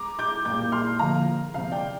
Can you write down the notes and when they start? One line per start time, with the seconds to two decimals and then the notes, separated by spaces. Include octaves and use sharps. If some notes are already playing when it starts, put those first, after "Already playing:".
Already playing: A#5 D6
0.19 D6 G6
0.45 A#2 G3 A#3 D6 G6
0.72 C6 F6
0.99 D3 F3 A#3 F5 A#5
1.54 C3 F3 C4 F5
1.71 D5 G5